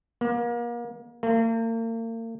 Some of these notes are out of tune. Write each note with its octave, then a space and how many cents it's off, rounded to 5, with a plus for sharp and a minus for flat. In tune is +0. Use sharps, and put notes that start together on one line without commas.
A#3 +35
A#3 -40